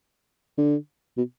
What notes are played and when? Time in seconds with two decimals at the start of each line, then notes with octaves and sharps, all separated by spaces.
0.58 D3
1.17 B2